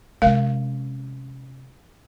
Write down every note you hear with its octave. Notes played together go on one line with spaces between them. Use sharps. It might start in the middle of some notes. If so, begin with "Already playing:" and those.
C3 G#3 C#4 A#4 F5